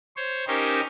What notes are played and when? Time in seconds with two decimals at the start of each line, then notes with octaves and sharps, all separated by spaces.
0.17 C5 C#5
0.47 C#4 D#4 G4 A#4 C5